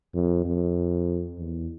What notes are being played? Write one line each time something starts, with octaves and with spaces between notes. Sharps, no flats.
F2
F2
E2